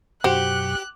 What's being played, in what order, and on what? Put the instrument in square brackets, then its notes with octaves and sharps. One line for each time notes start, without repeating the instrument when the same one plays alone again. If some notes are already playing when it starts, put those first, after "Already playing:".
[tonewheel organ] F#2 B2 F#3 [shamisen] F#4 C5 [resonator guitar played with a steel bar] G4 [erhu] F#6